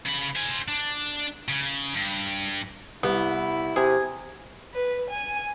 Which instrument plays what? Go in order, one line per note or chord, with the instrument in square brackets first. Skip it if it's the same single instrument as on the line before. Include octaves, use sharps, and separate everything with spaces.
[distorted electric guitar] C#3 B5
C5 G#5
D4
C#3
G2
[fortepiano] C2 G3 [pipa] B3 [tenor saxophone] E4
[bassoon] C3 [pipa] G#4
[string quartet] B4
G#5